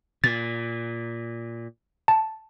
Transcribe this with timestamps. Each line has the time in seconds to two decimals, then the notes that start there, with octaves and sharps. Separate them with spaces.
0.24 A#2 A6
2.08 A5